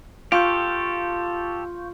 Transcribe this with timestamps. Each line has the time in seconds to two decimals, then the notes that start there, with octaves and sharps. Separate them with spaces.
0.32 F4 G4 A4 F5 C#6 G6